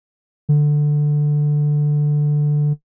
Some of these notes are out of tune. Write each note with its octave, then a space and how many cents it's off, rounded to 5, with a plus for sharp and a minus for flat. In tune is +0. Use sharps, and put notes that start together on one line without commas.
D3 +10